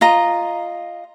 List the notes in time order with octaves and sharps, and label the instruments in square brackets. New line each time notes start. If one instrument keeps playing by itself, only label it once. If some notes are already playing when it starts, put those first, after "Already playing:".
[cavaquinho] F4 D#5 A#5